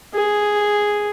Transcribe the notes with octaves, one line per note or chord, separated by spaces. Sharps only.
G#4